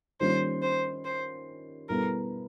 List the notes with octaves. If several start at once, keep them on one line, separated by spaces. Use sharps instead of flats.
D#3 G3 A#3 C#4 F4 C5
C5
C5
B2 G3 B3 E4 A4 A#4